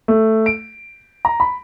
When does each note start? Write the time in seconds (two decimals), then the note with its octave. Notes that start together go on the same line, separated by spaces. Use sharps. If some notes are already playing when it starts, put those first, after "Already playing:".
0.08 A3
0.46 D7
1.25 A#5
1.40 B5